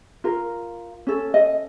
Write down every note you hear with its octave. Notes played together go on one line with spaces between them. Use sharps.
F4 A#4
C#4 A4
D#5